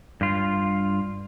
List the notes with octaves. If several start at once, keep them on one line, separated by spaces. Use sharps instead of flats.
G2 F4